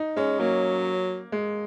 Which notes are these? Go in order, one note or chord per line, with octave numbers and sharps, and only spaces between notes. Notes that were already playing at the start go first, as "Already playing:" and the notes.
Already playing: D#4
G#3 C#4
F#3 A#3
G#3